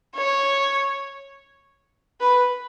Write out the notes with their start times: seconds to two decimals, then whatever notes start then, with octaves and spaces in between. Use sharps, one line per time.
0.15 C#5
2.21 B4